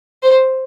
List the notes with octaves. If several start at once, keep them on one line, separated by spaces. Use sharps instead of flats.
C5